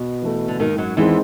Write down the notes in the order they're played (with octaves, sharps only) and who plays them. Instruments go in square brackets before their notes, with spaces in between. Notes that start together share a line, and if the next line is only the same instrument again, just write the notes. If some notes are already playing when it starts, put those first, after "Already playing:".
Already playing: [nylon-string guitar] B2
[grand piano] E3 A3
[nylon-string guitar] D3
[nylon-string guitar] D#2 D#3 [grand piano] G#2
[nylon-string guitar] F#2 F#3
[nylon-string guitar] E2 E3 [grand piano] D#3 G#3 C4 D#4